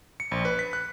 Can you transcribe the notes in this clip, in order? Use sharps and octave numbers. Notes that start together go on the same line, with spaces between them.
C#7
A#1
B4
B6
F#6